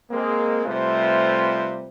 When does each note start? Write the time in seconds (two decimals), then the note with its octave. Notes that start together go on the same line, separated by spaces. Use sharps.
0.11 G#3 A#3 C4
0.66 C3 G3 A3 F4 B4 C5